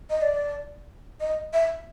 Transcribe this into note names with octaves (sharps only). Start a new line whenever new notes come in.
D#5
D5
D#5
E5